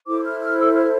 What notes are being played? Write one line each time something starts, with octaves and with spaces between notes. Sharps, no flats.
E4 A4 C5 D6
F6
F6
E6
F6